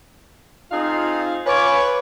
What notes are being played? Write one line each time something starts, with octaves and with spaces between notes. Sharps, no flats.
C4 D#4 F4 G#4 F5
F4 B4 C#5 G#5 D6